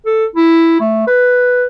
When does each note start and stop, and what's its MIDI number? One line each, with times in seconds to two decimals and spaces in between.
0.06 0.26 69
0.36 0.76 64
0.80 1.05 57
1.07 1.66 71